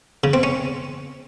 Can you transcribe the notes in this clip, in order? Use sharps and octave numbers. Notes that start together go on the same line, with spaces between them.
C#3
C4
C#4